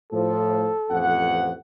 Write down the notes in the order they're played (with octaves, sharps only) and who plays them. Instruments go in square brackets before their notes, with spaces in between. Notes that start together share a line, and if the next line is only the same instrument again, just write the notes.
[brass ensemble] A2 F3 [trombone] A4
[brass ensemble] A1 F2 F#5